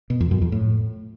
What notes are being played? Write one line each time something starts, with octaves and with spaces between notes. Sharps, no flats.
B2
F2
F#2
F2
A2